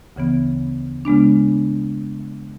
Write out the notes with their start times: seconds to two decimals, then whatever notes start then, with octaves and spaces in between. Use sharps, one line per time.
0.16 D2 C#3 E3 B3
1.05 C#3 G#3 B3 D4